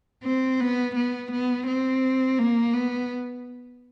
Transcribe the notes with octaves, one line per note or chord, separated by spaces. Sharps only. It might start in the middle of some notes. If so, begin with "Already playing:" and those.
C4
B3
B3
B3
C4
A#3
B3